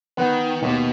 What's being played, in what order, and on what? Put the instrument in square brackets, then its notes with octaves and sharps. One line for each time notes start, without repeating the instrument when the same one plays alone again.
[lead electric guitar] D#3 [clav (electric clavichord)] B3
[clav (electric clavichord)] D#2 [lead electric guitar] B2